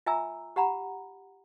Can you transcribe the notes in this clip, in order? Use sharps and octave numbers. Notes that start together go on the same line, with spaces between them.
F4 E5 G#5 A#5 E6
G4 F#5 A#5 B5